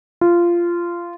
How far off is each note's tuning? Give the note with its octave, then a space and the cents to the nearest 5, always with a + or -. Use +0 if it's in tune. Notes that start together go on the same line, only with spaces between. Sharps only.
F4 -15